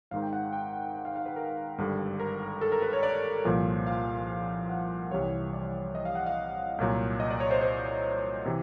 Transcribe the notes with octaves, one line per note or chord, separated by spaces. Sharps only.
G#1 G#2 D#3 F5
G5
F#5
G5
F#5
F5
F5
B4
A#4
G#1 G2 D3 G3
A#4
A4
A#4
B4
C#5
D5
C2 A#2 F3
F5
F#5
C2 C3 E3 G3 C#5
D5
D#5
F5
F#5
F5
C2 A#2 F#3
D#5
D5
C#5
C5
C5
C3 E3